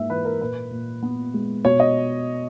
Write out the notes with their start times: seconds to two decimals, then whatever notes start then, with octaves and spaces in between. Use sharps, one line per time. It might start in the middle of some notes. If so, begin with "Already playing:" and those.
Already playing: G#2 A#3 E5
0.10 E3 B4
0.25 A#4
0.41 A#2 B4
0.71 A#2
1.03 B3
1.34 G#3
1.65 B2 C#5
1.80 D#5